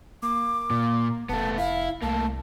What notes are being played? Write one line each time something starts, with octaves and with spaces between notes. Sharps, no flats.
A#3 D6
A#2
F1 A3 B3 A5
E4 F5
C2 A3 A#3 A5